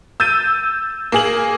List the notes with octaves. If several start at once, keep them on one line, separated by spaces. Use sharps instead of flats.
E6 G6 A6 D#7
A#3 G#4 F#7